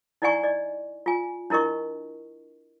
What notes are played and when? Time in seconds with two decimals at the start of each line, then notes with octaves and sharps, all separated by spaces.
0.22 D#4 E4 D5 F#5 G#5 C#6
0.43 D5 D#5
1.06 F4 G#5
1.50 D4 E4 A#4 D#5 C#6